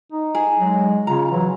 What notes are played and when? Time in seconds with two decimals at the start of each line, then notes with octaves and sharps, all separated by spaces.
0.13 D#4
0.35 G#4
0.60 F#3 G#3
1.07 C#3 F4 A#5
1.31 E3 F#3